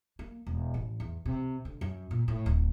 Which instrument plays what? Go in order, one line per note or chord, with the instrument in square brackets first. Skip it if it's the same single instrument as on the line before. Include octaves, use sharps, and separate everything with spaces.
[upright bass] A#3
E1
A1
E2
C3
D3
F#2
A#2
A2
D1